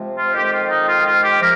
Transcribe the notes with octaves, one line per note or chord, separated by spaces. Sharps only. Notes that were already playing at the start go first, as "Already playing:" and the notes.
Already playing: C3 F3 G#3
F4
F2 D#3 G#3 C4 G4
F4
D#4
F4
F4
G4
C3 F3 A#3 A#4